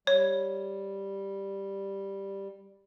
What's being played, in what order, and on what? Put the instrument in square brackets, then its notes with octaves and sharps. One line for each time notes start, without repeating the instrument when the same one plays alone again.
[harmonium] G3 [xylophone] C#5